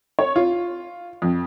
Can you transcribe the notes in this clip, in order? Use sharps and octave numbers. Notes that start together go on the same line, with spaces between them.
C#5
F4
F2